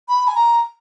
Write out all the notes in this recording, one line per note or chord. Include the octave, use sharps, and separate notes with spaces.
B5
G#5
A#5